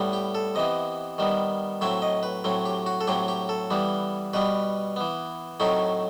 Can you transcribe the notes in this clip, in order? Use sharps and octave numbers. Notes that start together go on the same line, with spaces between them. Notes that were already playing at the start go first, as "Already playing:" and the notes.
Already playing: A2 G3 B3
G4
A4
C3 E3 B3 D#5
D#3 G3 B3
A2 F#3 C4 E5
D#5
B4
A2 F#3 C4
G4
F#4
A4
A2 F#3 C4 G4
G4
A4
E3 G3 B3
B2 G3 B3 B4
E3 B3
A2 F#3 A3 C4 D#4